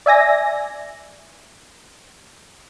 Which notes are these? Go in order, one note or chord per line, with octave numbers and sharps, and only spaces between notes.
D5 E5 G#5 A#6